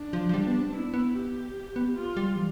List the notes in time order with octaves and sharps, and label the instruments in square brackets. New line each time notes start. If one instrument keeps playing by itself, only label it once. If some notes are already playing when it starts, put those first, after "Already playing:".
Already playing: [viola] D4
[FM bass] F3
F3
G3
B3
C4
[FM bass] B3 [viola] E4
[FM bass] B3
[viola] G4
[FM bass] B3
[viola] F4
[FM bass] G3
E3